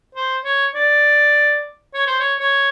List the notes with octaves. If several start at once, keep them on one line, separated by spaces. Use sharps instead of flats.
C5
C#5
D5
C#5
C5
C#5
C#5